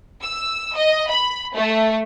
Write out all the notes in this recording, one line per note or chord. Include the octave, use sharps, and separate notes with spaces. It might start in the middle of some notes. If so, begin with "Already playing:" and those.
E6
D#5
B5
A3